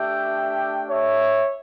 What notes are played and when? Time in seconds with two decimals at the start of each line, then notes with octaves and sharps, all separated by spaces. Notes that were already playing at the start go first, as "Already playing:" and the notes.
Already playing: A3 D4 G4 E5 G5
0.90 C#5 E5